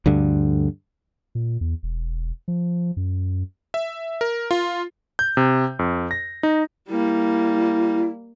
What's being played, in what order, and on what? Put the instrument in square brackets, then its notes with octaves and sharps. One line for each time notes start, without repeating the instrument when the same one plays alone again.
[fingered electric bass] D2 G2 D3
[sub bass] A#2
E2
E1
F3
F#2
[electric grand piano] E5
A#4
F4
G6
C3
F2
A#6
D#4
[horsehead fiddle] G3 A#3 [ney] E4